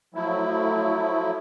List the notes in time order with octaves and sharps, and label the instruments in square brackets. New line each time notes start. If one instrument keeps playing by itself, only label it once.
[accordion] F3 F#3 A3 E4